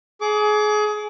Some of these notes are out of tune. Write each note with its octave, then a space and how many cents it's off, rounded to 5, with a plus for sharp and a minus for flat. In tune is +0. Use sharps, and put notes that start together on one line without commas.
G#4 +25 D6 -25